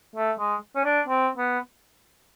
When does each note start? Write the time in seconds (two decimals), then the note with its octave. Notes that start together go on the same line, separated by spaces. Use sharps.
0.16 A3
0.39 G#3
0.75 C#4
0.84 D4
1.07 C4
1.38 B3